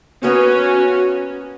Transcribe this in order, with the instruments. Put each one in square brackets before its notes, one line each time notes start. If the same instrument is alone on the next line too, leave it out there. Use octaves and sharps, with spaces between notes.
[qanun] A#3 B3 [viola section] C#4 [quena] F#4